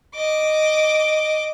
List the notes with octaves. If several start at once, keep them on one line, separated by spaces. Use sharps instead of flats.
D#5 D6